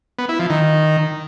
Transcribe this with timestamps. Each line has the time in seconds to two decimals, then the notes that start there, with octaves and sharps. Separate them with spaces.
0.19 B3
0.29 E4
0.39 F3
0.50 D#3